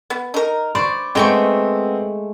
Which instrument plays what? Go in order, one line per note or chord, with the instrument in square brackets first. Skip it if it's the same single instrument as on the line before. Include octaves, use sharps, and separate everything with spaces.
[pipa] B3
D#4 A#4
[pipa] C5 [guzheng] D5 [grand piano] B5 C#6
[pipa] D#3 G5 C#6 [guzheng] G#3 A3 [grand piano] B3 C4